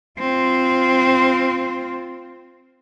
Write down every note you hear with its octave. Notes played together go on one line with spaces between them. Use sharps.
C4 F4